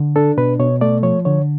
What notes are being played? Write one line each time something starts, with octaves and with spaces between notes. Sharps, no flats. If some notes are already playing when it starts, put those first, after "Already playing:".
Already playing: D3
D4 A4
B2 B4
B2 C#5
A3 D5
F3 C#5
D3 C#5